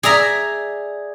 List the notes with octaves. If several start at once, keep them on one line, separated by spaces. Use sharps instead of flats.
G#4 D5 E5 A#5